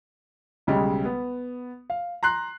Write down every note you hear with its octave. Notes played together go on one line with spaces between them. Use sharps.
B1 C#3 G3 G#3
B3
F5
A#5 C6 F#6 C7